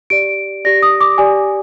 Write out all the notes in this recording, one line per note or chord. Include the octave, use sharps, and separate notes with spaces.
G4 D5 D7
G4 D5 A#6
D#6
D6
G4 D5 G#5